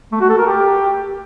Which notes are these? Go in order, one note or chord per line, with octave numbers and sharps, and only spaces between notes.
A3
F#4
A4
A#4
G4